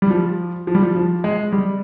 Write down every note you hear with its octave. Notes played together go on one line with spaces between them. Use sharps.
G3
F3
F3
G3
F3
F3
G#3
G3